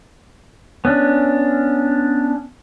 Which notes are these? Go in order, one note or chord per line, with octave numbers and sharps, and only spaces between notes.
B3 C#4 D4